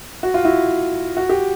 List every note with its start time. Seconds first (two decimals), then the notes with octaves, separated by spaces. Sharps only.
0.23 F#4
0.34 F4
0.45 E4 F#4
1.17 F#4
1.29 G4